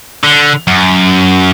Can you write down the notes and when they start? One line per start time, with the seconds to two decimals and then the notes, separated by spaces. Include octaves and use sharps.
0.24 D3
0.68 F#2